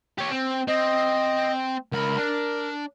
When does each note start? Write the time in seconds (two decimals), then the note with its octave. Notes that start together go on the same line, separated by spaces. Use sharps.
0.18 G4 C#5
0.30 C4
0.67 C4 D#5
1.92 C#2 A#4 B5
2.17 D4